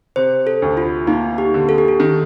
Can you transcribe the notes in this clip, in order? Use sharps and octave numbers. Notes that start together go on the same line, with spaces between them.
C3 C5
A4
D2
F4
A#3 D#4
G4
D3
A4
G4
A4
D#3